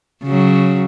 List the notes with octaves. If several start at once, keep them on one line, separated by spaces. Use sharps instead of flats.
C#3 F#3